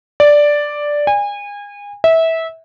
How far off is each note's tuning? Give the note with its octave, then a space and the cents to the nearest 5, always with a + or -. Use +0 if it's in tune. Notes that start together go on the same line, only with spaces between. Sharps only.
D5 +0
G#5 -30
E5 -20